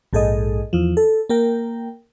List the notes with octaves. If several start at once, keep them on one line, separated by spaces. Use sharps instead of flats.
A#1 G#2 G#4 A4 D#5
E2 F3
A4
A#3 A#4 G5